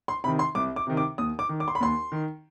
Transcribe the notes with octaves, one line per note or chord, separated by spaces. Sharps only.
C6
C3 D#3 B5
C6
C2 D6
D6
C3 D#3
D6
D#2 D#6
D6
D#3
D6
C6
B5
D#2 C6
D#3